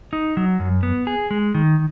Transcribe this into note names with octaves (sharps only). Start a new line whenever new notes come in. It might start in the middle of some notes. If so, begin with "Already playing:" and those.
D#4
F#3
F#2
B3
G#4
G#3
D#3